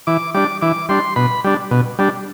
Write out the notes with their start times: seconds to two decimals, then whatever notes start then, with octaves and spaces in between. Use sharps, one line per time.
0.07 E3 D6
0.34 G3 D4 D6
0.61 E3 D6
0.89 G3 D4 C6
1.16 B2 B5
1.44 G3 D4
1.71 B2
1.99 G3 D4